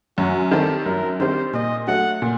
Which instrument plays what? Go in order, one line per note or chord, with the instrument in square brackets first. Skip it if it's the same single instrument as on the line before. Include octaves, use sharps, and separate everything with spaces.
[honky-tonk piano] F#2 [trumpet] F#4
[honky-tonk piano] D#3 G3 C4 G4 [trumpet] A4
[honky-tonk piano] F#2 [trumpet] A#4
[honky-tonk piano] D#3 G3 C4 G4 [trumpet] C5
[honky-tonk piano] A#2 [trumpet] D#5
[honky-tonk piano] F#3 A3 [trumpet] F#5
[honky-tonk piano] A#2